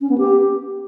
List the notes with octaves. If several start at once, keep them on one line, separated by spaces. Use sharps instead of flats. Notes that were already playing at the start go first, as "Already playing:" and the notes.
C#4
B3
G4